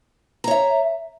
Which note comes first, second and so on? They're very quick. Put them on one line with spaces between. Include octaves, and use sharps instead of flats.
A#5 C#5 E5